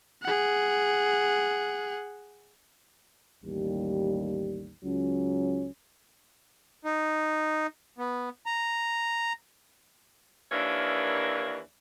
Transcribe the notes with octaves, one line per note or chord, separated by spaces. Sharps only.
G#4 F#5
A1 D#2 G3
C#2 F#3 C#4
D#4
B3
A#5
D#2 D#3 E3 A#3 D4 C#5